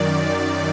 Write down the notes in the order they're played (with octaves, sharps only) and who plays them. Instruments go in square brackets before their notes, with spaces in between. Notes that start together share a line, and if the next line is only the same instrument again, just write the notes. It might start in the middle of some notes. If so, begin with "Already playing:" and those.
Already playing: [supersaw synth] F#2 D#3 D5